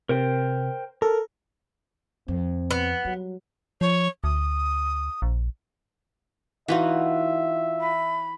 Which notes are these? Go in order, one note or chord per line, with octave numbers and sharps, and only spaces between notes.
C3 A#4 C5 G5
A4 A#4
F2 C4
B3
F#3 G3
F3 C#5
D2 D#6
A#1
E3 D#4 F4 F#4 E5 F#5
B5